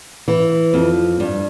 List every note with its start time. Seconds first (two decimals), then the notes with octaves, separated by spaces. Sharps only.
0.28 E3
0.74 F2
1.20 G2